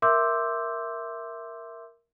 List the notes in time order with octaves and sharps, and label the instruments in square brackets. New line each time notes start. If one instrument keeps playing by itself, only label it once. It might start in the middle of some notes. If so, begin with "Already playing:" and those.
[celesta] A#4 E5 C6 D6 E6 G6